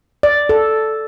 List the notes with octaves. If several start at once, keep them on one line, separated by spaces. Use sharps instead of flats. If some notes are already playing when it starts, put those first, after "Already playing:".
D5
A4